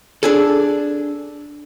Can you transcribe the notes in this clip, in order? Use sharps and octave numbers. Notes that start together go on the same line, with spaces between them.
D4 G#4 A4